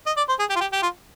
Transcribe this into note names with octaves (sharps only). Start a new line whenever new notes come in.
D#5
D5
C5
G#4
G4
F4
G4
G4
F4